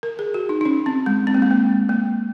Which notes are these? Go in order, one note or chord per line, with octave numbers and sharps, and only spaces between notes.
A#4
G#4
F#4
D#4
D#4
C#4
C4
G#3
C4
A#3
G#3
A#3
A#3